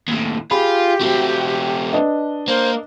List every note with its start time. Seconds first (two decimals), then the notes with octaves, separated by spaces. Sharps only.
0.08 D#2 A2
0.51 F4 G4 G#4 B5
1.01 A3 C4 F#4
1.93 D4 B4 D#5
2.48 A#3 C5